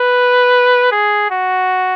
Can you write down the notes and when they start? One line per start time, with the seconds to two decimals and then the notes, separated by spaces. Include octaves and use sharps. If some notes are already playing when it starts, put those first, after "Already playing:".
Already playing: B4
0.92 G#4
1.30 F#4